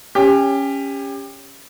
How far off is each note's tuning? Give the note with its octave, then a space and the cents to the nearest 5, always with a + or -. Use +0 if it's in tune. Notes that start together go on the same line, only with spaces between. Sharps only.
C#4 +0 G4 +25